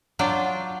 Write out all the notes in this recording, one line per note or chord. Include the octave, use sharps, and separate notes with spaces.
F#3 D4 F4 D5 G5